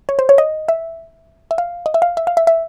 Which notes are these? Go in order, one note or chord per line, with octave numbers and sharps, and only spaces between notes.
C#5
C5
C#5
D#5
E5
E5
F5
D#5
E5
F5
E5
F5
E5
E5